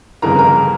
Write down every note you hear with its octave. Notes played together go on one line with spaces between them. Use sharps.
G1 F2 C#3 E3 A#4 A#5
A#4 A#5